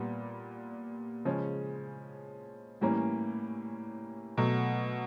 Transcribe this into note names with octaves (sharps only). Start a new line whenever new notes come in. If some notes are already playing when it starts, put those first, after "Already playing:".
Already playing: A#2 G3 B3
C#3 F3 G#3 C#4
A2 E3 G3 A#3 C#4
B2 F#3 A3